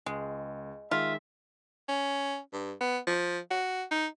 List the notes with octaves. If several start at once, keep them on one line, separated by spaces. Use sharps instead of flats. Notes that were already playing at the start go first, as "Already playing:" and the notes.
C#2 G#3
D#3 G#3 F4 E5
C#4
G2
B3
F3
F#4
D#4